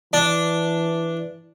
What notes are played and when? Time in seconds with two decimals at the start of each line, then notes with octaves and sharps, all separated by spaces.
0.13 E3 D4